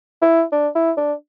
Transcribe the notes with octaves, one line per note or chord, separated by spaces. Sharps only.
E4
D4
E4
D4